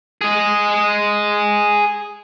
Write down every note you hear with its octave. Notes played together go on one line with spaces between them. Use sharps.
G#4 D#5